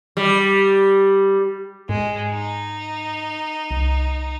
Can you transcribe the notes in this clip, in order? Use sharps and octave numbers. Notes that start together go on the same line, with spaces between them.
G3
G#2 G#3
D#4
C2